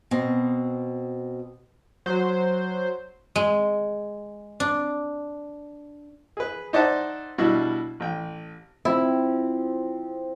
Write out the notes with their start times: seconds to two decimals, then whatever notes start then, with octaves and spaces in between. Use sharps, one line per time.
0.11 B2 C4
2.06 F#3 C5
3.36 G#3
4.60 D4
6.37 G#4 B4
6.73 D#4 C5 D5 E5 F#5 A5
7.38 B2 G3 D4 E4 E6
8.00 A1 G5
8.85 F3 C4 E4